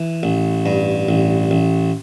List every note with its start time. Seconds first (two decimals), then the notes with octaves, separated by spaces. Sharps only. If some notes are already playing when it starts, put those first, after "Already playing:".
Already playing: E3
0.23 A1
0.66 G2
1.09 A1
1.51 A1